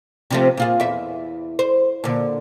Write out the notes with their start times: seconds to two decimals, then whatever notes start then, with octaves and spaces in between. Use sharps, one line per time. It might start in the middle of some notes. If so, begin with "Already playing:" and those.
0.30 C3 F3 A3
0.57 A#2 F4 G#4
0.80 E2 E5
1.59 C5
2.04 A#2 D3